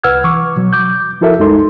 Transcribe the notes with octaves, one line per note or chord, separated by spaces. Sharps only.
C2 B4 F#5 E6 F6 G#6
E3 C#6 D6
B2 F#3
D6 G6
F3 E4 F#4 A4 A#4 E5
C2 F#2 G#3 D#4 A4 C6